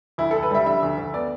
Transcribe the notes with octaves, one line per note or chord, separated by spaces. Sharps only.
D2 E4
D2 A4
B4
G3 E5
D3 E5
D2
D2
B3 D5